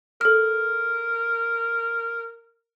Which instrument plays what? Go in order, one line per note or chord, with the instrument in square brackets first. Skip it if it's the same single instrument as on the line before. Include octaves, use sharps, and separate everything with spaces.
[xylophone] A4 F6 [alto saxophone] A#4